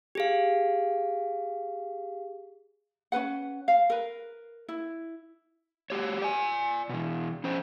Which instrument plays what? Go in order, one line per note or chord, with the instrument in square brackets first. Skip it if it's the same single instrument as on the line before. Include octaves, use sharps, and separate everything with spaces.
[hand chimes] G4 G#4 F5
[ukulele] C#4 D#4 B4 F#5
F5
A#4 B4
E4
[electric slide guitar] F#4 G4 C#5
D5 G#5
B2 E3
F3 C#4 C5